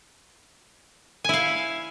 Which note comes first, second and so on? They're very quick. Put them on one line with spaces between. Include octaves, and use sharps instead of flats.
G#5 E4 F5